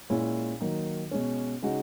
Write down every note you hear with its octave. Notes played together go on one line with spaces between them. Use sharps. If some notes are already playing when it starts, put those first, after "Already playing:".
A#2 G#3 C#4 E4
D#3 F#3 A#3 D#4
B2 G#3 C#4
C#3 G#3 D#4 F#4